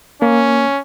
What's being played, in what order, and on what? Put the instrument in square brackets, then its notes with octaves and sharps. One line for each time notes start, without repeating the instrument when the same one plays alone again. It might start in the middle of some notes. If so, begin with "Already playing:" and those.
[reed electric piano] A#3 [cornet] C#4